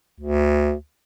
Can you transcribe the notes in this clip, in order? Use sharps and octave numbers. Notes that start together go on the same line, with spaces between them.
D2